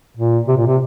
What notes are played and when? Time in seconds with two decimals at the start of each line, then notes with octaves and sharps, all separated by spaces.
0.17 A#2
0.48 C3
0.57 A#2
0.67 C3